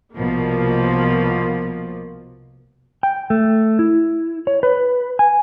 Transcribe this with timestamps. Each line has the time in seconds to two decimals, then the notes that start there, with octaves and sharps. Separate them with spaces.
0.15 C2 B2 F3 A#3
3.03 G5
3.30 A3
3.79 E4
4.47 C#5
4.63 B4
5.19 G#5